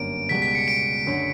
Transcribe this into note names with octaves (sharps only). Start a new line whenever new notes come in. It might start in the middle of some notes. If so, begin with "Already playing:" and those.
Already playing: G1 F#2 D3 A#3 D7
C#2 B2 G3 B6
B6
C#7
D7
F#1 F#2 D3